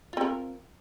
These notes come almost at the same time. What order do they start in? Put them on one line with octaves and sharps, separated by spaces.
F4 C4 A#4